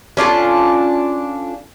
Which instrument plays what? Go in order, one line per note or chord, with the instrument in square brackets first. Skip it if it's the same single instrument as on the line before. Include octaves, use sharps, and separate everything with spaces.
[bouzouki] C#4 D4 F4 A4